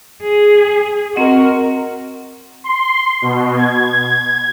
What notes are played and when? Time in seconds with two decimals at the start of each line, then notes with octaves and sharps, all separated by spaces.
0.23 G#4
1.16 C4 F#4 A#4 D#5 F#5
2.64 C6
3.22 B2
3.57 G#6